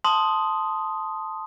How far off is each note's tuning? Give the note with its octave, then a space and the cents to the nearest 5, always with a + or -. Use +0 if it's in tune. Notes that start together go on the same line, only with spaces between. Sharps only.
A5 +0 C6 -5 D#6 +0